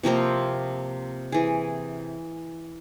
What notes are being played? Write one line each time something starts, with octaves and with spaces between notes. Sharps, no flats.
C3 F3 A#3 C4
E3 G#4